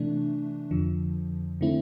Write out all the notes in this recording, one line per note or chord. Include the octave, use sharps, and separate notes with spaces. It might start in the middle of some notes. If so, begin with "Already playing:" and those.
Already playing: C3 E3 A3 D4
F2 D3 F3
D3 A3 C4 E4